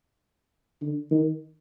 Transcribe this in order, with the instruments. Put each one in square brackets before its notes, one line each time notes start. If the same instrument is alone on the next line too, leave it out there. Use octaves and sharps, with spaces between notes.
[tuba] D3
D#3